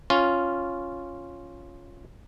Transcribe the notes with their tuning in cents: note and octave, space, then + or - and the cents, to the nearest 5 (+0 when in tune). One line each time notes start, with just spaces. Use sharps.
C#4 +0 F4 +0